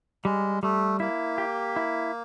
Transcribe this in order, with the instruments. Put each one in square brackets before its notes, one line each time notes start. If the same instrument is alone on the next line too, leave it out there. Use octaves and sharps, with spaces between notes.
[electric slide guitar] G3 [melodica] G#3
[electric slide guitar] G3 [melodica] A3
[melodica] A#3 [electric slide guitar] E4
[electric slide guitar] G4
E4